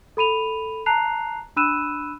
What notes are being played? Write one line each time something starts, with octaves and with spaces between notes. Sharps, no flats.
A4 B5 D#7 F7
A5 A#5 F#6 C7 F7
D4 B5 E6 F#6 D#7 E7